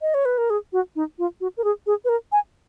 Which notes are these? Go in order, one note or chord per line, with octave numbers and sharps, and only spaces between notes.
D#5
C#5
B4
A#4
G#4
F#4
D#4
F4
F#4
A#4
G#4
G#4
B4
A#4
G#5